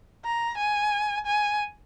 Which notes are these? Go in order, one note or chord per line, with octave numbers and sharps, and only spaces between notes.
A#5
G#5
G#5